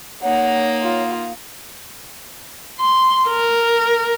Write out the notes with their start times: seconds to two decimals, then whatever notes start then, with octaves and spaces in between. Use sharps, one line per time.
0.23 A#3 D#4 C#5 F#5
0.82 F4
2.79 C6
3.28 A#4